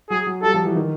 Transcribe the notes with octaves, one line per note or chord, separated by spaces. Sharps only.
F#3 G#4
F#3
G3 A4
F3
E3
D#3